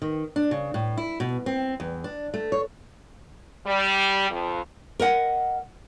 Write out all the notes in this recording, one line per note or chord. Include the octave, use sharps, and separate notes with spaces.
D#3
D4
C#3
A2
E4
B2
C4
E2
D4
A3
C#5
G3
F2
A#4 D#5 F#5